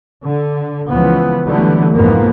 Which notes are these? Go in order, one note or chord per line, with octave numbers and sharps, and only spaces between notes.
D3
C#2 C#3 E3 F3 B3
D3 E3 F#3 G3 A3 B3
C2 F2 G#2 F3 A#3 B3